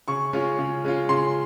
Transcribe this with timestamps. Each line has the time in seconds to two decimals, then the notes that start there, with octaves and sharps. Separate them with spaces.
0.08 C#3 C#6
0.33 G#3 C#4 F4
0.59 C#3
0.84 G#3 C#4 F4
1.09 C#3 C6